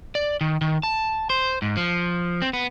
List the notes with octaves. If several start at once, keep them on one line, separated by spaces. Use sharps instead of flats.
D5
D#3
D#3
A5
C5
G#2
F3
C4
B3